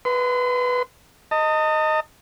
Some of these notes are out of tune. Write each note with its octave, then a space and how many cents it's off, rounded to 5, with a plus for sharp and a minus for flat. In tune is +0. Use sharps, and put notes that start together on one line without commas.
B4 +0 C6 -40
D#5 +0 A5 +45